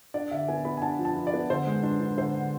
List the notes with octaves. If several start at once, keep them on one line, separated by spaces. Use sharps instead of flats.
D4 D5
D3 E5
B3 G#5
B3 B5
G#5
D4 A5
F3
A5
F3
D5
B3
D3 C5
G#3
D4
D4
D3 C5
D3